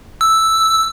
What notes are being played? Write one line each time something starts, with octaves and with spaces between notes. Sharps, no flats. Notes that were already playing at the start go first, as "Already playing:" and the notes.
E6